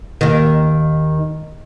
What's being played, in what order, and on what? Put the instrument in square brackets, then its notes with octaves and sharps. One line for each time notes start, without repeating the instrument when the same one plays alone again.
[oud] D#2 D#3